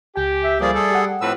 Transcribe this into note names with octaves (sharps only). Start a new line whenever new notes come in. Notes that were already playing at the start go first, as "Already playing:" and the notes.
C#2 G4 G#5
E5
F3 G3 A3 A#3 G#4 D5
G#4 A4
G4 F#5
F2 A2 B4 E6